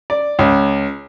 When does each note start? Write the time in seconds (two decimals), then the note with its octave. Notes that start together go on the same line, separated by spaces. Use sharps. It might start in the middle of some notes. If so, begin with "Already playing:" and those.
0.10 D5
0.39 C#2